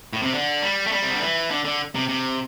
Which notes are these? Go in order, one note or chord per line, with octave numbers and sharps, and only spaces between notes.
A2
C3
D3
G3
A3
G3
C3
D3
E3
D3
D3
C3
C3